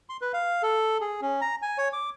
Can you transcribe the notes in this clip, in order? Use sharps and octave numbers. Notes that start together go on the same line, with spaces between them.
C6
B4
F5
A4
G#4
C#4
A#5
G#5
C#5
D6